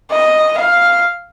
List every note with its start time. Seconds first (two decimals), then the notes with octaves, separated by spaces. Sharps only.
0.11 D#5
0.59 F5